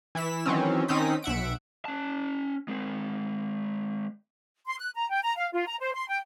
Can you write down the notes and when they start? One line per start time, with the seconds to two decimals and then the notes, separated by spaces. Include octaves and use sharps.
0.15 E3 E4 B6 E7
0.45 D#3 E3 F#3 C4 C#4
0.88 D#3 C4 C#4 D#4 D#6 B6
1.22 B1 E5 F#5 D7
1.85 C#4 A5
2.68 G#3 C4
4.67 C6
4.79 F#6
4.94 A#5
5.10 G5
5.23 A#5
5.36 F5
5.52 F4
5.67 A#5
5.80 C5
5.93 C6
6.08 G5